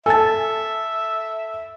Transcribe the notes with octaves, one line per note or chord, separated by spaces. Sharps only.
A4 E5 G#5 A5 A6